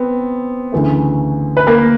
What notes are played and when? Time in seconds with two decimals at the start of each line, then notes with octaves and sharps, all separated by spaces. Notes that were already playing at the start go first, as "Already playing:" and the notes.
Already playing: B3 C4
0.72 D2 C#3 E3 A3
1.57 B4
1.67 A#3 A#4